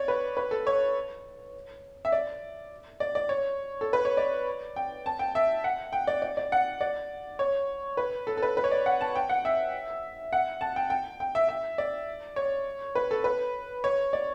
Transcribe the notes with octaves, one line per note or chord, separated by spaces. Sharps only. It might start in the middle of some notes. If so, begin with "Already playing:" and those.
Already playing: C#5 D5
B4
B4
A4
C#5
E5
D5
D5
D5
C#5
A4
B4
C#5
D5
G5
A5
G5
E5
F#5
G5
D5
D5
D5
F#5
D5
C#5
B4
A4
A4
B4
B4
C#5
D5
F#5
A5
G5
F#5
E5
F#5
A5
G5
G5
G5
E5
E5
D5
C#5
B4
A4
B4
C#5
D5